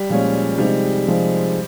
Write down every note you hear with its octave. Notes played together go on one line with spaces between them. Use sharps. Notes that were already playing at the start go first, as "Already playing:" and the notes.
Already playing: G3
A#2 F3 G#3 C#4
C3 F3 G3 G#3 C4 D#4
C3 F3 G#3 C4 D#4